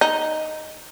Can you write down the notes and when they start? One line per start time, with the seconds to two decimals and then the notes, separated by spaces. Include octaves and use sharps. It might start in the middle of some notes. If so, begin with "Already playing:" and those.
0.01 D#4